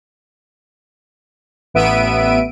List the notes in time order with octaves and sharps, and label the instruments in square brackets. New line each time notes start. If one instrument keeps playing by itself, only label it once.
[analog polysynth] A1 B3 E5 D7 D#7